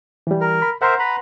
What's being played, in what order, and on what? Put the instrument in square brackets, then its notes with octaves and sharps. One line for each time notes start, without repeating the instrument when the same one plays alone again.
[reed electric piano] E3 G3
[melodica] A#4
[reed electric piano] B5
[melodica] A#4 C5 E5 [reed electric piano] F#5 C6
[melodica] B4 A#5 B5